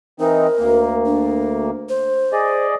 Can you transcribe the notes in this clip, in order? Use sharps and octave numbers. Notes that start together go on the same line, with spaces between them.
E3 C4 D#4 A#4
D2 A#3
D4
C5
G#4 D5 D#5